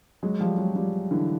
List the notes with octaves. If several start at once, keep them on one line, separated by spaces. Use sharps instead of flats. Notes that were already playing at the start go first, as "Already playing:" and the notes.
F#3 G#3
F3 G3
F#3 G#3
F3 G3
D3 E3